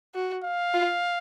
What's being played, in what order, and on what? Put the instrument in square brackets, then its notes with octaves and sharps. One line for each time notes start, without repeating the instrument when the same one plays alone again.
[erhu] F#4
[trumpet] F5
[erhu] F4